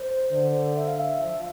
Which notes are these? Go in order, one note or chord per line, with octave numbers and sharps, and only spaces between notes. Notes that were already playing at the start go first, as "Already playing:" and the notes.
Already playing: C5
D3
E5
F5
E5
F3